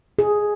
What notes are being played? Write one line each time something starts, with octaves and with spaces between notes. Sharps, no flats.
G#4